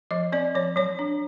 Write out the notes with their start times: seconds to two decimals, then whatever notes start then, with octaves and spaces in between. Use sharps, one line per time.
0.11 F3 D#5
0.32 C4 D5
0.55 F3 C#5
0.76 F#3 C#5
0.99 D4